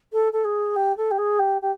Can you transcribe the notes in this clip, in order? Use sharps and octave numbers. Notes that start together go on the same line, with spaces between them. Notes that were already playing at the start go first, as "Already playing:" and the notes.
A4
A4
G#4
G4
A4
G4
G#4
G4
G4